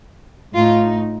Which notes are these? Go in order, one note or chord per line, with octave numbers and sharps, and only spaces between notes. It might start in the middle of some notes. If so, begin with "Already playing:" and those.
A2 A3 D#4 F4